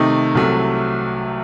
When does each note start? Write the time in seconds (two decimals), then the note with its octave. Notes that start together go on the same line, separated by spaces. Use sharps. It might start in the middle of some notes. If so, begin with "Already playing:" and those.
Already playing: C3 D#3 A3 D#4
0.35 C2 C3 F#3 A3